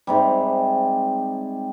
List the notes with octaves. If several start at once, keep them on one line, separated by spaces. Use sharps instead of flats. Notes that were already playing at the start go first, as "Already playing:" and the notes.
G#2 C3 G3